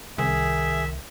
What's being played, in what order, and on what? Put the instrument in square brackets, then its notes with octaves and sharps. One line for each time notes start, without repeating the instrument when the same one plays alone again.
[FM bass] C2 [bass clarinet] D#3 [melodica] G#4 [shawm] E5